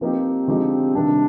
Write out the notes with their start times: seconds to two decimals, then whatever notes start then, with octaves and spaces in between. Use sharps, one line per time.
0.01 F3 A#3 C4 D#4 G4
0.48 D3 F3 G#3 D#4 G4
0.95 C3 D#3 G3 D4